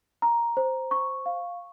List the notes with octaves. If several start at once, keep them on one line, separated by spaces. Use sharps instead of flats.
A#5
C5
C#6
F5